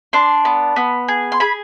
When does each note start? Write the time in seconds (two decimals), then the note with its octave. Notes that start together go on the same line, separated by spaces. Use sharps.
0.13 D4 C6
0.45 B3
0.76 B3
1.08 G#4
1.32 C6
1.40 G#4 B5